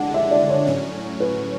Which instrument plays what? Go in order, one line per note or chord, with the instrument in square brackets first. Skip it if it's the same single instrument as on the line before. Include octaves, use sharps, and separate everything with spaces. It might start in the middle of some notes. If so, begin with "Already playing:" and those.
Already playing: [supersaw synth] D3 G#3 D4 [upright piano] F#5
[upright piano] E5
D5
C#5
[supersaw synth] A2 F#3 C#4
[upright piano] B4